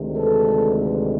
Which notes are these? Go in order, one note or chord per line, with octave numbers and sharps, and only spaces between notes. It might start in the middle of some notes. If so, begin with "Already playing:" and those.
Already playing: D2 C3 D#3 G#3
A4 B4